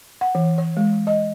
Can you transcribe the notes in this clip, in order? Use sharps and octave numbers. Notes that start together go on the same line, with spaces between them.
F#5
E3
C#5
G#3
D#5